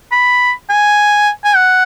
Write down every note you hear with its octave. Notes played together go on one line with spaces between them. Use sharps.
B5
G#5
G#5
F#5